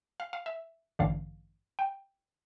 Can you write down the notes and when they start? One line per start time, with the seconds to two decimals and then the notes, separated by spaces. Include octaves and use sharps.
0.20 F5
0.33 F5
0.46 E5
0.99 A1 G2 D3 F5
1.79 G5